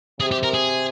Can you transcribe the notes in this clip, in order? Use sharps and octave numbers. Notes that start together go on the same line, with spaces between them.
C3 G#4
G4
A#4
G#4